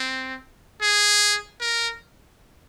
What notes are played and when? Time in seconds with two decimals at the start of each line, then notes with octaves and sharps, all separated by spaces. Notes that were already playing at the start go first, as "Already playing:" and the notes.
Already playing: C4
0.81 G#4
1.60 A#4